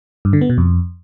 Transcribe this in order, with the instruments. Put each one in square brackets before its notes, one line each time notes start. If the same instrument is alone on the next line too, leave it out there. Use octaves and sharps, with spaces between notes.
[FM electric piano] G2
D3
B3
B2
F2